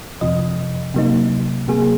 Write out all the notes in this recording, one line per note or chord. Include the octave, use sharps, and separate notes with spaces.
F2 C3 F3 D#5
C3 F#3 A#3 D#4
C3 F#3 A#3 G#4